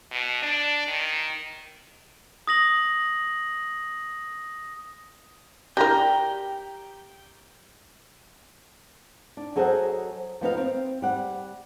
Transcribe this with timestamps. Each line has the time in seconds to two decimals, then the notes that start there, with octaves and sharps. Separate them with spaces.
0.12 B2
0.43 D4
0.88 D#3
2.47 D#6 A#6 F#7
5.77 D4 G4 A#4 G5 A#5
9.37 D4
9.56 F#3 G#4 A4 C5 D#5 F#5
10.41 F3 B3 D#4 F5
10.57 C4
11.02 G3 F#5